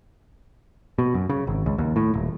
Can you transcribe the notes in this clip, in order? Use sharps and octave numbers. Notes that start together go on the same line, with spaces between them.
B2
F#2
C#3
G#1
C#2
D#2
A2
D#1